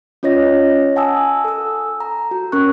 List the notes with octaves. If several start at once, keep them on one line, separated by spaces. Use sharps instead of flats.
C#4 F4 C#5 D#5 A#6
F#5 G#5 A5 D#6 E6
A4 E6
A#5
F#4
C#4 A#4 C#6 F#6